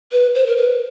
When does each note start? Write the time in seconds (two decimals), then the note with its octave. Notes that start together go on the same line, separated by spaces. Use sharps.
0.12 B4
0.35 C5
0.46 A#4
0.57 B4